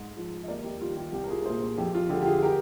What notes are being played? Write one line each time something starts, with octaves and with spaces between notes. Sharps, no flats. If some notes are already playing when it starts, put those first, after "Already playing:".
Already playing: G#2
F3 G#3
D#5
D#2 A#4 D5
G4
D#3 G3 F4
G4
C2 G4
A#4
F4 G#4
A#2 G#3 G#4 C5
F2 G4
F4
D3 G#3 G4
G4
F4 G#4
G4 A#4